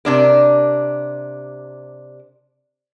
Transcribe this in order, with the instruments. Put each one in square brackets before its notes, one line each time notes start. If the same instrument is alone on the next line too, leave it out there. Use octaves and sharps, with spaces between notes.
[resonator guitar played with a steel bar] C3 D4 A#4